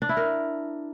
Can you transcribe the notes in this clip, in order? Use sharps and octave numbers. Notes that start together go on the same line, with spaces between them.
D4
E4
A#4